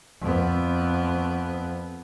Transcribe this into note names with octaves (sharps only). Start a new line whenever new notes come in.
F2 B3